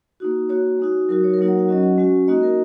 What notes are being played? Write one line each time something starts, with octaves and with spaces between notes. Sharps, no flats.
A#3 D#4 F#4
A#3 F#4 C#5
G#3 D#4 F#4
F#3 D#4 F#4 A#4
C#5
A#4
F#3 A#3 D#4 F#4 C#5
F#5
F#5
F#3 C#4 F#4 D#5
F#5
G#3 C#4 F#4
A#3 D#4 F#4 D#5
A#4